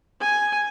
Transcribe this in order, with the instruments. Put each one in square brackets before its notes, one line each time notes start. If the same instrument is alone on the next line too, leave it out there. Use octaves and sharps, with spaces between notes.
[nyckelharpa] G#5